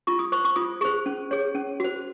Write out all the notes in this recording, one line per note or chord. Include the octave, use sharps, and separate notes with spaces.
F4 C#6
D#6
C5 C#6
C#6
F4 D#6
G#4 C5 C#6
C#4
G#4 C#5
C#4
F#4 C5